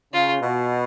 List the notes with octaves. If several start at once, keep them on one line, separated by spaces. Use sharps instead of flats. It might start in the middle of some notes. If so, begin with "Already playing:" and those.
C#3 F4
B2